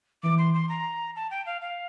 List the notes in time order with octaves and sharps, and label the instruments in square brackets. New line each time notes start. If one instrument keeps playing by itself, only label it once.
[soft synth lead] E3 [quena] D6
[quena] C6
C6
A#5
A5
G5
F5
F5